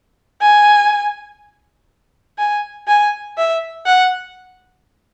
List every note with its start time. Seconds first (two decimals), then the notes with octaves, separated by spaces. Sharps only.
0.42 G#5
2.39 G#5
2.88 G#5
3.38 E5
3.86 F#5